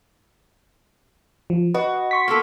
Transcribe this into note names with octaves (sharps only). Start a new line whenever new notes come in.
F3
F#4 B4 D#5
C6 C#6 B6
A#3 B3 A4